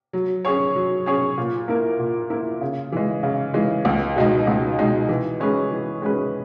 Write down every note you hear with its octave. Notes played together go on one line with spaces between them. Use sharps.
F#3
C#4 G#4 C#5
F#3
C#4 G#4 C#5
A#2
A#3 E4 A#4
A#2
A#3 E4 A#4
C#3
E3 G#3
C#3
E3 G#3
C#2
B2 G#3 D#4
C#2
B2 G#3 D#4
E3
G#3 C#4 G#4 B4
E3
G#3 C#4 G#4 B4